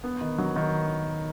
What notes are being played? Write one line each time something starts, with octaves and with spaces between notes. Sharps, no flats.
B3
D#3
F#3
D#3